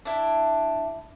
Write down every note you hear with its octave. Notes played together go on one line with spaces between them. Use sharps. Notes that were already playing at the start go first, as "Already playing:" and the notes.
D4 E4